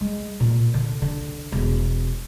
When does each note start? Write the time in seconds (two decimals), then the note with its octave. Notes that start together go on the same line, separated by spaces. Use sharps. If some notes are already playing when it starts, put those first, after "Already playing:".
0.01 G#3
0.40 A#2
0.74 D3
1.02 D3
1.52 E1